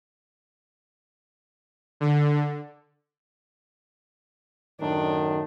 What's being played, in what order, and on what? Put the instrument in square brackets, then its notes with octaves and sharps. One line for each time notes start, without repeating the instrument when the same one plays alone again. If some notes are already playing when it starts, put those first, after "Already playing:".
[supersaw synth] D3
[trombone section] F#2 A2 D#3 [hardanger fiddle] D4